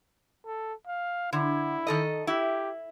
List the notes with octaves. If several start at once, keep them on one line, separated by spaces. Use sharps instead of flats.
A4
F5
D3 E4
D#3 A4 D#5
E4 G4